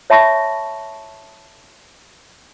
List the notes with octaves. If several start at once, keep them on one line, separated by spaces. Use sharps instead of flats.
C#5 E5 A5 B5 C#6 A#6